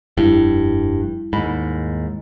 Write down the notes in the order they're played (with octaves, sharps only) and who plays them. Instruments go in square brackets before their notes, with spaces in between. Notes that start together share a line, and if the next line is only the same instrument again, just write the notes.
[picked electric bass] F1 G2 [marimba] G3 E4
[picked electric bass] D#2 G#2 [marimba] B5